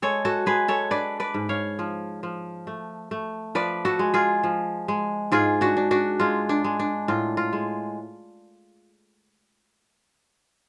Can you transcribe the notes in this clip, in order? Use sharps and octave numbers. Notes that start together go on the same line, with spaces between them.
G#3 A4 C#5
F#4 A4
G#3 G#4 B4
A4 C#5
D4 B4 D5
B4 D5
G#2
C#5 F5
F3
F3
A3
A3
F3 B4 D5
F#4 A4
G#3
F4 G#4
F3
G#3
G#2 F4 G#4
D4 F#4
D4
D4 F#4
G#3 F4
D4
G#3
D4
A2 F4
F4
G#3